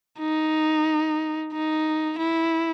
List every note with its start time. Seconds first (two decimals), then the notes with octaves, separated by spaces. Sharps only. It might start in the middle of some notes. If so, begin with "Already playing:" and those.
0.20 D#4
1.53 D#4
2.18 E4